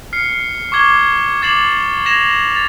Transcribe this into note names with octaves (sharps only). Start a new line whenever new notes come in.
F6 C7 C#7
C#6 D6 G#6 G7
D6 G#6 A6 C7 E7 F#7
G#6 A#6 E7 F7
A6 F7